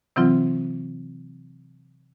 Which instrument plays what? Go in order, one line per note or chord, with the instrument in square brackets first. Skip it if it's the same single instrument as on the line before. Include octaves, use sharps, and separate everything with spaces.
[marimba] C3 E3 F#3 C4 F4